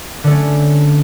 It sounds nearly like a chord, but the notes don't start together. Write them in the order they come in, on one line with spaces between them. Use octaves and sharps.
D3 A3 C#4